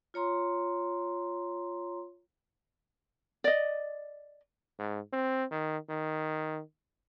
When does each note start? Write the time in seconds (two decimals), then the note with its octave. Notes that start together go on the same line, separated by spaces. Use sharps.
0.14 F4 C#5 A#5 C6
3.44 D5 D#5
4.79 G#2
5.13 C4
5.51 D#3
5.89 D#3